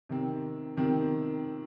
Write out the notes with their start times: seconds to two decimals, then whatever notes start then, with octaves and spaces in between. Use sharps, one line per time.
0.09 C3 D#3 C4
0.77 C3 D#3 C4